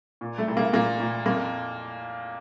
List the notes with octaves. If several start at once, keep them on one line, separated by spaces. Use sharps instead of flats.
A#2
A3
C2
A#3
A#2 A#3
A#2
F2 A#3